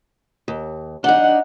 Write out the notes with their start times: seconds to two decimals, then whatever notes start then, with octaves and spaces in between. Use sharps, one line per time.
0.48 D#2
1.04 D4 D#4 F#5